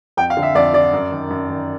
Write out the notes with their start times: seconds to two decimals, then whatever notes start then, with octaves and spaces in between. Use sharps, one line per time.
0.17 F2 G5
0.30 F5
0.37 D3
0.43 E5
0.55 F2 D5
0.74 D3 D5
0.93 F#2
1.11 D#3
1.30 F#2
1.50 D#3